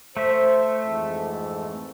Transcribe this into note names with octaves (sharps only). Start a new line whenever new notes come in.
A3 C5 E5
F2 G#2 E3